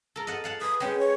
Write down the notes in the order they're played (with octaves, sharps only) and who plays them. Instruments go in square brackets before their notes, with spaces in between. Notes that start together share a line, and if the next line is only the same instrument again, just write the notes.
[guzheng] A4 A#4
D#5 F#5 A5
F5 F#5 A5
[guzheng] B4 [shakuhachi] D#6
[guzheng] G#3 C#4 [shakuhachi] G5
[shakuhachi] C#5